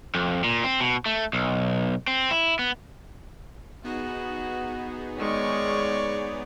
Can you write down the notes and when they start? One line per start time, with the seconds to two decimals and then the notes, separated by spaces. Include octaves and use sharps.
0.15 F2
0.44 A#2
0.64 C4
0.80 B2
1.06 A3
1.33 B1
2.07 C4
2.31 E4
2.59 B3
3.85 B3 D#4 F#4 G#4
5.18 D#3 G#3 C#5 D5 C#6